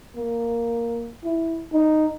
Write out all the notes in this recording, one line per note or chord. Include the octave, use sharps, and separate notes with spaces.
A#3
E4
D#4